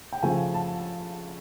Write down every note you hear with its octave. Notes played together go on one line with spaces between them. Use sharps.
G5
C#3 F3 A3 G#5
A5